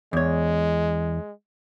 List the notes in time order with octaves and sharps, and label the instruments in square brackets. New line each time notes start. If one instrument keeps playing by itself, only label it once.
[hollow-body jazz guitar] E2 C#5 [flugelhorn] G#3